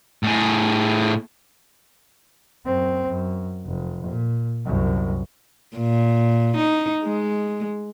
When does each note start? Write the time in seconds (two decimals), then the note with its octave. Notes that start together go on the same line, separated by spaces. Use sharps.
0.23 A2 G#4
2.66 F#2 C4
3.09 F#2
3.66 F1
4.07 A#2
4.66 C2 F#2
5.77 A#2
6.58 D#4
7.04 G#3